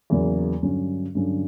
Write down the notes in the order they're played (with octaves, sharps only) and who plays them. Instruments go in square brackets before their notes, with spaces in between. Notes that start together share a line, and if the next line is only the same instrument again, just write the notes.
[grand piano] E2 C#3 F#3 A#3
G2 D3 F#3 C#4
G2 D3 F#3 C#4